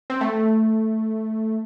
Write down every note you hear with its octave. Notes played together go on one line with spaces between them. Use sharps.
C4
A3